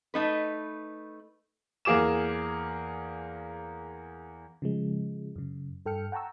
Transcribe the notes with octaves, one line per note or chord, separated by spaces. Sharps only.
A3 D#4 B4
E2 A#3 G#4 D6 E7
C#3 F3 G#3
F#2 C#3
G2 A4 G5 F6 C#7
F#5 G5 A5 A#5 C#6 E6